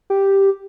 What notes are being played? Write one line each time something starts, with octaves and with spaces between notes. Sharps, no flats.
G4